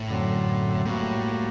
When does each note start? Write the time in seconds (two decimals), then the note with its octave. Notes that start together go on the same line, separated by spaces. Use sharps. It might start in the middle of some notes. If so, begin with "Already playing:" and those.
Already playing: A2
0.09 F#2 D3 F#3 C4
0.85 A2 G3 A#3 F#4